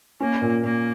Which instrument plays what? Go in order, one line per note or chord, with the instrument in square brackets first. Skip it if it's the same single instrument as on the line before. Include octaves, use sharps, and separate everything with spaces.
[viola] A#3 [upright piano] C#4
[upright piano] A#2
[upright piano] A#2 [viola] A#3